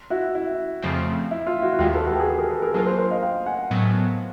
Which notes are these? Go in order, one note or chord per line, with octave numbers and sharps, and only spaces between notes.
E4 F#4
E4
F2 C#3 F3 A3 C4
E4
F4
E4 F#4
F#4
D#2 D#3 G#3 F4 G4
A4 B4
F#4
G4
G#4
G4 A4
G#4 A#4
A4 B4
G#4 A#4
F#3 A#3 D4 F4 G#4 A#4
A#4 C5
A#4 C5
D#5 F5
F5 G5
F#5 G#5
A2 F#3 B3